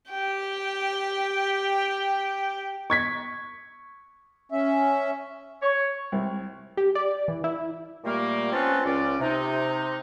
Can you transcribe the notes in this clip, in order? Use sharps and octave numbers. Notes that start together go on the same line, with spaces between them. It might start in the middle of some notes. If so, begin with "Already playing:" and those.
G4 G5
C#6 G#6 B6
C#4 E5
C#5
C2
G4
D5
E3
E4
A#2 G3 A3 A#3
C4 C#4 F4 B4 F#5 A5
C#2 C#4 D5
C3 D#4